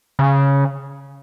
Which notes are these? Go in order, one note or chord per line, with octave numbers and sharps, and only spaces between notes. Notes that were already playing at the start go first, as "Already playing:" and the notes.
C#3